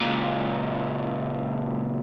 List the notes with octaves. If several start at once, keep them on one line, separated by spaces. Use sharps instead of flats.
C#2 A#2